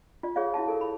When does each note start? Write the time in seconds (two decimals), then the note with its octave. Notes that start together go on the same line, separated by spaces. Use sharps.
0.23 F4 D5
0.36 G#4 C#5 D5 F5
0.54 E4 F#4 F5 A5
0.68 A4 A#4
0.81 B5